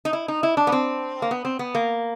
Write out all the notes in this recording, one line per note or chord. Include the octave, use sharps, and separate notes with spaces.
D#4
E4
D#4
E4
D4
B3
C4
A#3
B3
C4
B3
A#3